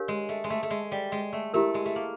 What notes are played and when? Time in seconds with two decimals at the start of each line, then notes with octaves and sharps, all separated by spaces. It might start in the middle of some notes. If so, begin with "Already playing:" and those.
Already playing: D4 G4 A#4 C#5 F5
0.08 G#3
0.29 A3
0.44 G#3
0.50 A3
0.63 A3
0.70 G#3
0.92 G3
1.12 G#3
1.33 A3
1.54 A3 E4 G4 A#4
1.74 G#3
1.86 A3
1.96 A#3